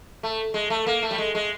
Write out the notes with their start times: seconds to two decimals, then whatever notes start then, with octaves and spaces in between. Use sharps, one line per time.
0.23 A3
0.54 G#3
0.70 A3
0.87 A#3
1.03 A3
1.11 G3
1.18 G#3
1.35 G#3